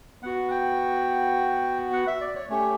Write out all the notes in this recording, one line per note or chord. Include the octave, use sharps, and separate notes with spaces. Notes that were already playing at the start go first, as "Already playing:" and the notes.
B3 F#4 F#5
G5
F#5
E5
D5
C#5
A3 C#4 G4 C#5